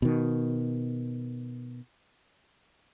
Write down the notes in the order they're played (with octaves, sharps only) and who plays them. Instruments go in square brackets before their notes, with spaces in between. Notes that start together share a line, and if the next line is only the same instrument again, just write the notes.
[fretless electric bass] B2 D#3